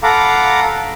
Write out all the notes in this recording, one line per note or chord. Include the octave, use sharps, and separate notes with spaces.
A4 F5 F#5 A#5 B5 D6